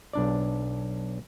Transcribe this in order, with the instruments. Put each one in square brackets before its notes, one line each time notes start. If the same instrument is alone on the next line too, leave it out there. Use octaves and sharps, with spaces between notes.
[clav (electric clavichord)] B1 D4 D5